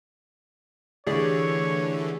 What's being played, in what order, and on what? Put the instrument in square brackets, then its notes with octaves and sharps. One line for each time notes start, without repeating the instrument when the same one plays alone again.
[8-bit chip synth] D3 E3 A3 [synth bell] G4 G#4 D5 [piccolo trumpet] C#5